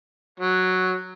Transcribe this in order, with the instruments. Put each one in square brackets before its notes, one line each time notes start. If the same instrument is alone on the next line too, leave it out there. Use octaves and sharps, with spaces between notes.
[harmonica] F#3